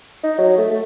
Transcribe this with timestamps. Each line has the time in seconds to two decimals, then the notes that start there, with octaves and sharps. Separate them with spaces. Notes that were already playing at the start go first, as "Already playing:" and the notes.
0.24 D#4
0.38 F#3
0.58 A3
0.71 A3